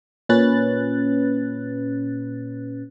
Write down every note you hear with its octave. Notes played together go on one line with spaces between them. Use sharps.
A#2 C#4 B4 F#6 A6